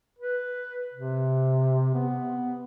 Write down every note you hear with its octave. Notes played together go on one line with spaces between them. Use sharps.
B4
C3
B3